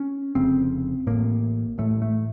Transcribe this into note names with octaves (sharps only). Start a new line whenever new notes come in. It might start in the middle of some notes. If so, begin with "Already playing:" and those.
Already playing: C#4
F1 F2 C#3 C4
A1 A2 A#3
A1 A2 A3
A3